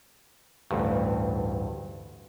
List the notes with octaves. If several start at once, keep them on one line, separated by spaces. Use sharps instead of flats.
A1 D2 G2